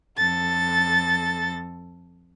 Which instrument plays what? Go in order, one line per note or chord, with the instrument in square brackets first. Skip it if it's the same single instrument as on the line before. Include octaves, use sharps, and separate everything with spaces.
[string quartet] F2 A4 A6